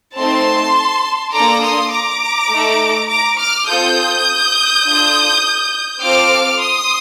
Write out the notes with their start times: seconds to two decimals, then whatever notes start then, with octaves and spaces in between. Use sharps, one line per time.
0.15 A3 C4 D#4 A4 A5 C6
1.32 A#3 D4 A4 A#5 D6
1.62 C6 D#6
1.91 A#5 D6
2.50 A3 D#4 A4
3.09 A#5 D6
3.37 D6 F6
3.67 C4 F4 A4 D#6 G6
4.85 D4 F4 A4
6.02 C4 F4 A4 D6 F6
6.60 C6 D#6